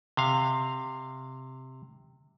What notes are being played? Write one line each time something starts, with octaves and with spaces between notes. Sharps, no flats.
C3 F5